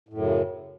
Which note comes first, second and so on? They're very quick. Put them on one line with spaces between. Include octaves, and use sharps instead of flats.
A2 F#2 C#3